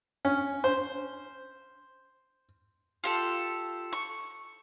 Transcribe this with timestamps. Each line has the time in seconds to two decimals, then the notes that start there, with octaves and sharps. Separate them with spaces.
0.25 C#4
0.64 C5
3.04 F4 G4 A4
3.93 C#6